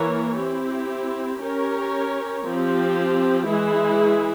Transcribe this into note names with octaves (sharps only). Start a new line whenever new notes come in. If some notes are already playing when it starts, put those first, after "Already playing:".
Already playing: E3 A#3 E4 A#4 C#5
C4 E4 G4
C#4 G4 A#4 C#5
F3 C4 G4
E3 G#3 E4 G#4